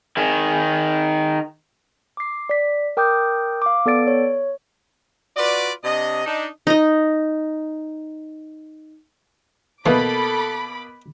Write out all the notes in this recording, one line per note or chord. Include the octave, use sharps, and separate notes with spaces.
D#3 G#4
D6 C7
D5 B6
A#4 G5 D6 D#6 G6
F5 D6
B3 A4 D5 A6 D7
C#5
F4 F#4 B4 D5
C3 D4 D#5
D4 D#4
D#4 D#5
B2 E3 A#3 B3 A4 B5 D6